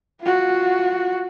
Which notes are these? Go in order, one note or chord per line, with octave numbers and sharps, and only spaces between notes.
F4 F#4